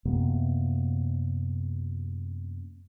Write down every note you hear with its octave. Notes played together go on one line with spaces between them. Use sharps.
F#2 C3 A#3 B3